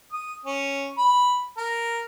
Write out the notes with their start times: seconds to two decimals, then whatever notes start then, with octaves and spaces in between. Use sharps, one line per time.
0.12 D#6
0.46 C#4
0.98 B5
1.57 A#4